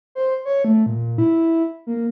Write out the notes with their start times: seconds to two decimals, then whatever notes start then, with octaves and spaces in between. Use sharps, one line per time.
0.15 C5
0.45 C#5
0.65 A3
0.86 A#2
1.18 E4
1.87 A#3